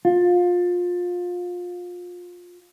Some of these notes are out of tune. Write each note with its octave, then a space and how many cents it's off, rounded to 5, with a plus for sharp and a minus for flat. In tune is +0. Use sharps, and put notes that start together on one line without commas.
F4 +25